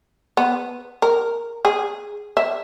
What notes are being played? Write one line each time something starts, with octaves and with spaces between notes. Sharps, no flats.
B3
A#4
G#4
E5